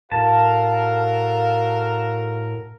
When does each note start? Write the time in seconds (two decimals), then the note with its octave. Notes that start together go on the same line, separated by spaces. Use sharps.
0.12 A2 F#4 A4 A#4 F5 A5